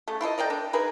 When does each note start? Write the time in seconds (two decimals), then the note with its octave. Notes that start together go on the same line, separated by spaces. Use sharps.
0.08 C#3 A3
0.21 E4 F4 A4 D#5
0.38 A#4 D5 D#5 G5
0.50 D4
0.73 D#4 G#4 A#4 B4